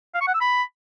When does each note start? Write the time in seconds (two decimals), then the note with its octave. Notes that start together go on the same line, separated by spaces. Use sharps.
0.14 F5
0.21 C#6
0.28 F#5
0.34 E6
0.41 B5